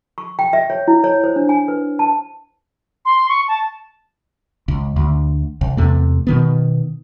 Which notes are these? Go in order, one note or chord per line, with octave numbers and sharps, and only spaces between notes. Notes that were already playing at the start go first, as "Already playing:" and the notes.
C#6
G5
E5
C#5
E4
C#5
C5
D4
G#5
B4
A5
C6
C#6
A5
C#2
D2
C2
E2 C3 A3
B2 D#3 B3